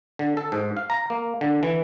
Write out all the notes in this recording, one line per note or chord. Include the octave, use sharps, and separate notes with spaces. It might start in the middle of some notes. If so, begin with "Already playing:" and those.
D3
A4
G#2
F5
A#5
A#3
D3
E3